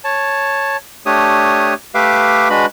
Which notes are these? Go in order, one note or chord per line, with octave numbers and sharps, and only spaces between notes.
C#5 A5
A3 D4 G4 C#5 D#6
A3 G4 B4 E5 F5 D6
G#3 D4 F#4 B4 B5